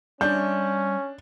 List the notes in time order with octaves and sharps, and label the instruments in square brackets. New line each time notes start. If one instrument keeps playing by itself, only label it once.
[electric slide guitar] G3 E5 [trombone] C#4 [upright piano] D4 [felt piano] G6